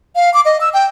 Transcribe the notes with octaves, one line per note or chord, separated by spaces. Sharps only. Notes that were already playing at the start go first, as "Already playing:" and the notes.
F5
D6
D#5
E6
G5